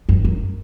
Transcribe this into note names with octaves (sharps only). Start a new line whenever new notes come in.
F#2
F#2